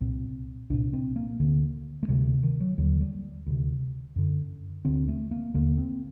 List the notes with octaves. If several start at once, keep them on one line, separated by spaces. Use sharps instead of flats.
C2 A#2 C4
C2 A#2 D4
C4
A#3
D2 D3
A3
D2 C3 G3
D#3
F#3
D#2 D3 F#3
G3
D2 C3
F#2 D3
D2 D3 C4
A3
A#3
D#2 D3 A#3
C4